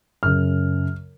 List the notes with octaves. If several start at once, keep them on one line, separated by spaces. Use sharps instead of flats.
F#2 C#3 F6